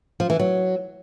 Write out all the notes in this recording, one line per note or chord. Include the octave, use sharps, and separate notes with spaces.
F3
E3
F#3